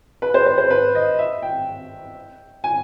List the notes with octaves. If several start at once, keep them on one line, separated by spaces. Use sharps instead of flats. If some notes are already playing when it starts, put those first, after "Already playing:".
B4
C5
C5
C5
B4
D#5
E5
G5
G#5